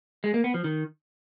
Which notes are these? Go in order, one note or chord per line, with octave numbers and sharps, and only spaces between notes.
G#3
A#3
B3
F3
D#3